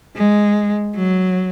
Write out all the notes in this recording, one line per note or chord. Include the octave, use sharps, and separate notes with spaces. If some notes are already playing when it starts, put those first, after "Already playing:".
G#3
F#3